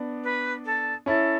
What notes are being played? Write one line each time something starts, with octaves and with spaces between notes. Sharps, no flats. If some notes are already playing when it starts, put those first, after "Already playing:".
Already playing: B3 D4
B4
A4
C#4 E4 A4